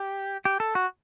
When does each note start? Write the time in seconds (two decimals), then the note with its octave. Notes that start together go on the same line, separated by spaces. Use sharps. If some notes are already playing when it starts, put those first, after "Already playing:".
Already playing: G4
0.45 G4
0.60 A4
0.75 F#4